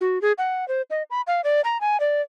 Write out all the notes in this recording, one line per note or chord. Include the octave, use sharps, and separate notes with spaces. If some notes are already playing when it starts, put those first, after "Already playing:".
F#4
G#4
F#5
C5
D#5
B5
F5
D5
A#5
G#5
D5